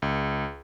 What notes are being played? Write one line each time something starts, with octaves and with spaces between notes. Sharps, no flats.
C#2